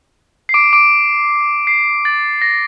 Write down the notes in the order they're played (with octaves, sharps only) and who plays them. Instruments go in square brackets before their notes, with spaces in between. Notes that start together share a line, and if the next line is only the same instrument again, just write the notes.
[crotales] C7
D6 D7
D6 D7
C7
A6
A#6